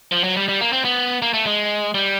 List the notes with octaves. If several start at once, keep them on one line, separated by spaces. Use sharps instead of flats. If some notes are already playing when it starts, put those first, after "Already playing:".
F3
F#3
G3
G3
A#3
C4
B3
A#3
A3
G#3
G3